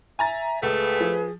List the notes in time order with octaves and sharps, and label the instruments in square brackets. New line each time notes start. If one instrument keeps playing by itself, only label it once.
[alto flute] E5 [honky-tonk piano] G#5 A#5 A6
[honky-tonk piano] C#2 [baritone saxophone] A3 [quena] G#4 [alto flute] B4
[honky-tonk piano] F3